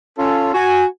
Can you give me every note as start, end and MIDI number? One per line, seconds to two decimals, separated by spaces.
0.19 0.53 61
0.19 0.53 65
0.19 0.53 69
0.54 0.85 66
0.54 0.85 80